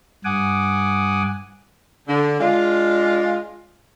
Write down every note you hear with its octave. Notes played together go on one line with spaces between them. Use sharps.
G2 F#5 G#5 D6 D#6
D3
G#3 D4 F4